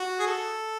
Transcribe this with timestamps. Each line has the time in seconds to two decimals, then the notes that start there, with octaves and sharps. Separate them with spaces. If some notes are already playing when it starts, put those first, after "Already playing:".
Already playing: F#4
0.19 G#4
0.26 A4